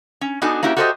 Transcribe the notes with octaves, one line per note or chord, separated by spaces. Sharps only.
C#4
B3 D4 D#4 F#4 A4 G#5
A#3 C#4 E4 F#4 G4
F#4 G4 A4 C5 D5 D#5